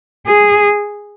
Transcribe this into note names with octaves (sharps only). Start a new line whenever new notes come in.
G#4